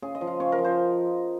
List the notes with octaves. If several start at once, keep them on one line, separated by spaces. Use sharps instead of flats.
C#3 G#4
D#5
F3
F5
C#3 C#5
A#4
F3
C5